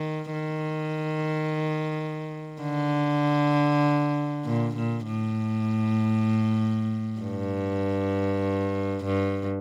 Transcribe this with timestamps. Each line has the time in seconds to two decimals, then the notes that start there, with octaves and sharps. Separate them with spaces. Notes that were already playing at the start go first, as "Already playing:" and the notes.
Already playing: D#3
0.32 D#3
2.62 D3
4.45 A#2
4.76 A#2
5.06 A2
7.21 G2
9.04 G2